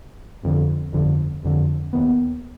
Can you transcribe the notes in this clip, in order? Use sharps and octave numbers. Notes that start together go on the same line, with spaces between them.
G1 F2 D3
G1 F2 D3
G1 F2 D3
D#2 D#3 B3